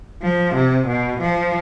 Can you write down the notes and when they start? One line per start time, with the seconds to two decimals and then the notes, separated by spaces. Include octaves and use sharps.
0.22 F3
0.55 C3
0.87 B2
1.20 F3